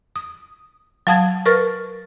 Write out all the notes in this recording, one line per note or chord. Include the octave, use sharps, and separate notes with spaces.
D#6
F#3 F5 A5 D#6 G#6
A#4 B4 C#6 F6 A6